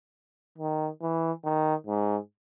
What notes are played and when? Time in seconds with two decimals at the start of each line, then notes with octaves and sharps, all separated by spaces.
0.58 D#3
1.02 E3
1.44 D#3
1.87 G#2